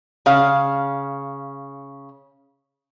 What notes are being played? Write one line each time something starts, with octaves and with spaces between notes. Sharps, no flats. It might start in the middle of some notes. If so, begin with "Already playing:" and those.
C#3 F5